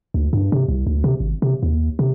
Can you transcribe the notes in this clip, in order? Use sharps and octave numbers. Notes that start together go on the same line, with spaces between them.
D2
G2
C3
C2
D2
C3
G#1
C3
D#2
C3